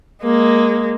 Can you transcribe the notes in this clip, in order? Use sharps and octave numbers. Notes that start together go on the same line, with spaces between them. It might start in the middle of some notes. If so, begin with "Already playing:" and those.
G#3 A#3